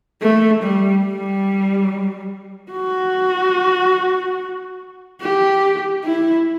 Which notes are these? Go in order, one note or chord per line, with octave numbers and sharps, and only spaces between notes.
A3
G3
G3
F#4
G4
E4